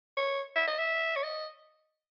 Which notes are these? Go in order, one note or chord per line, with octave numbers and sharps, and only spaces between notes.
C#5
E5
D#5
E5
C#5
D#5